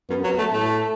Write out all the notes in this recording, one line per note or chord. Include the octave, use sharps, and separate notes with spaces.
F#2 B3
F#3
A3
A2 A3